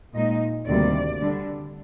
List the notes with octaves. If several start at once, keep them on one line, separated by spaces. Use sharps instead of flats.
A#2 G#3 D#4 D#5
D2 C3 D#3 G3 A#3 D5
D3 G3 D4